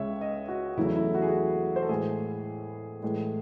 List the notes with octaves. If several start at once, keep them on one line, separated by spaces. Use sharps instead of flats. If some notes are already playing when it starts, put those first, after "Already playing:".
Already playing: C#2 C#3 G#3 C#5 E5
D#5
F#4
E2 C#3 F#3 A3 E4
E4
F#4
G#4
F#4
C5
A4
A2 E3 G#3 G#4
A2 E3 G#3